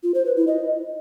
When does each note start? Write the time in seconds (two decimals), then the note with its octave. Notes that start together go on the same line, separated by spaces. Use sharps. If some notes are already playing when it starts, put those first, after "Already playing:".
0.03 F4
0.14 C5
0.25 B4
0.36 E4
0.47 D#5